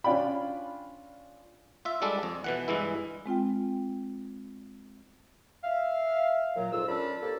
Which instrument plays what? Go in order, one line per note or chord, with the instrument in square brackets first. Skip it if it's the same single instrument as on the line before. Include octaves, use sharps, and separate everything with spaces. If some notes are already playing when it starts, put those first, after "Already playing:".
[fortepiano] C#4 D4 F4 D5 G5 B5
[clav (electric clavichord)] F4 E5
G3 G#3 D4 A4
F2
B2 E3 F#5
G2 E3 G#3 E4
[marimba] G#3 C4 F4 G5
[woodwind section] E5 F5
A#2 F#3
F2 G#2 F4 A4 E6
C#4 D4 F4 A#4 A5 B5
A#3 C4 G4 A4